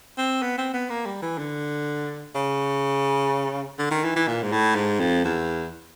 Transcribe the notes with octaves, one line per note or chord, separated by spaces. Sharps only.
C4
B3
C4
B3
A#3
G3
E3
D3
C#3
D3
D#3
E3
E3
A#2
G#2
A2
G#2
F2
E2